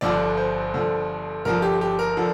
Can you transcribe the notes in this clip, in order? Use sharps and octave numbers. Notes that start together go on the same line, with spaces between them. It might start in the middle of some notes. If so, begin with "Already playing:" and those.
G1 G2 D3 F3 D5
C5
G1 G2 D3 F3
G1 G2 D3 F3 A#4
G4
G4
A#4
D3 F3